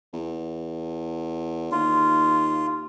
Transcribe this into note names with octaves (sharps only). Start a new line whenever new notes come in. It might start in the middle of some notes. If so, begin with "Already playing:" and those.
E2
D#2 F4